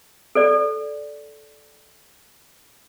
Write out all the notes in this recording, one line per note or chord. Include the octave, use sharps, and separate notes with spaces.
A4 C5 D5